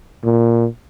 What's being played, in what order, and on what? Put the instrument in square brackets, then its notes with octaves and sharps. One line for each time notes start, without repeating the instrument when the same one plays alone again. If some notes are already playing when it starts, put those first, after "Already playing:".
[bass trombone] A#2